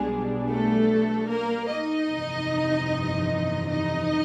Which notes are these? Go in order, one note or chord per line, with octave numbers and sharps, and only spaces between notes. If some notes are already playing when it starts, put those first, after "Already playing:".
Already playing: B1 B2 G3 G#3 B3 D4 G#4
A3 A4
A#3 A#4
D#4 D#5
G1 F2 C3 E3
D#4 D#5